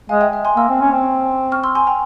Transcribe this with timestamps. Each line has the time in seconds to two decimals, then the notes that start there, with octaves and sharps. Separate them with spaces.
0.09 G#3 F5 G#5
0.21 E5 G5
0.33 E5
0.45 G#5 C6
0.56 A#3 C6 E6
0.69 C4
0.81 C#4
0.92 C4
1.52 C#6 F6
1.64 C6 E6
1.75 G#5 C6
1.87 G5 A#5